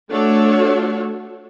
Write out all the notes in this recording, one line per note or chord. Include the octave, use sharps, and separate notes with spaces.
A3 D4 F#4 A4 C#5